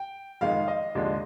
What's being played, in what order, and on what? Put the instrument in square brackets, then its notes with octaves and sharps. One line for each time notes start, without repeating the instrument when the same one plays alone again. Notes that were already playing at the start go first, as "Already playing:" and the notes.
Already playing: [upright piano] G5
F2 D#3 G#3 F5
D#5
D#2 D3 F3 G#3